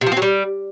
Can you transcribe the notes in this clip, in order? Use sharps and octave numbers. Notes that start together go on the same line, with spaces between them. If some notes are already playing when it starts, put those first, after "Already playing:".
C3
F3
C4
F#3
G3